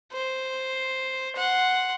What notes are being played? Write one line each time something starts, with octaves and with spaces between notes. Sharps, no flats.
C5
F#5 C6